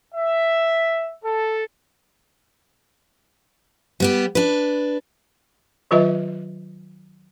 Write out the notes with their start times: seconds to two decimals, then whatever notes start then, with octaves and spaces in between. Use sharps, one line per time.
0.15 E5
1.23 A4
4.00 G3 B3 G4
4.35 D4 B4
5.91 D#3 F#3 F4 B4 D#5 E5